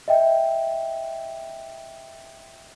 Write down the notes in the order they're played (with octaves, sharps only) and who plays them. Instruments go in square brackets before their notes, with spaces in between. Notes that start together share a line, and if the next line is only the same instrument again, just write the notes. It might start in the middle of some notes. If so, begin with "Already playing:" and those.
[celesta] D#5 E5 G5